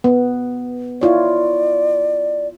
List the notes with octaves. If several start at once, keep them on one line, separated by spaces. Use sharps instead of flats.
B3
E4 F4 C#5 D5